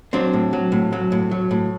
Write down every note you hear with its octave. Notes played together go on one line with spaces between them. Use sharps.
F#3 C4 D4
A2
F#3
A2
F#3
A2
F#3
A2